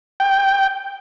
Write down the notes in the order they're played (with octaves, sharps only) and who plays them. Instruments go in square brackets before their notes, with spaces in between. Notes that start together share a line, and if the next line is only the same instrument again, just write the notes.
[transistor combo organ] G5